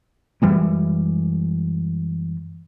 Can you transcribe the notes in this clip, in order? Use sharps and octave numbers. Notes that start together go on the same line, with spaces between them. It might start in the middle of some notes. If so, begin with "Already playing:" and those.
F#2 E3 G3 G#3